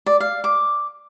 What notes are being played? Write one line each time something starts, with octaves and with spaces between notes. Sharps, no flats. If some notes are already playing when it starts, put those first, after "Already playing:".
D5
F5
D6